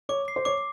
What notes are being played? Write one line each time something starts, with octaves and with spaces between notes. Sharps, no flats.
C#5 D6
C7
C5
C#5 D6